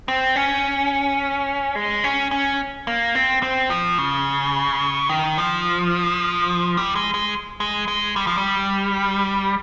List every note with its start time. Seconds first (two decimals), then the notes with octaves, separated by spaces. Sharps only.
0.08 C4
0.36 C#4
1.75 G#3
2.04 C#4
2.31 C#4
2.87 A#3
3.15 C4
3.42 C4
3.70 F3
3.98 C#3
5.09 D#3
5.38 F3
6.77 G3
6.95 G#3
7.14 G#3
7.60 G#3
7.88 G#3
8.16 G3
8.27 F3
8.38 G3